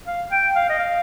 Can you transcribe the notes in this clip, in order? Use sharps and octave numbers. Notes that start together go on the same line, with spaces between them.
F5
G5
F5
D#5
F5